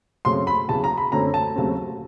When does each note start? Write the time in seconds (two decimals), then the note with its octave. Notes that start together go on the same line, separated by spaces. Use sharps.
0.25 F#2 C#3 F#3 A3 C4 C6
0.47 B5
0.68 E2 C#3 F#3 A5
0.84 A#5
0.98 B5
1.12 F#2 D3 F#3 A3 C4 A#5
1.34 A5
1.55 D#2 C#3 F#3 A3 C4